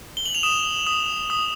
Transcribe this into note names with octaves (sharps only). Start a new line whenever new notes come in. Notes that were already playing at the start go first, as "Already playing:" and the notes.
G7
F#7
F7
D#6 E7
D#6
D#6